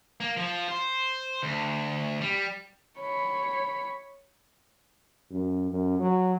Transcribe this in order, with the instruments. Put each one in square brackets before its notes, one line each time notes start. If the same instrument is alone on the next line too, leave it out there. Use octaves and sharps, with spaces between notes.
[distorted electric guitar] A#3
F3
C5
D2
G3
[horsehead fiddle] C#5 B5
[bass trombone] F#2
F#2
F#3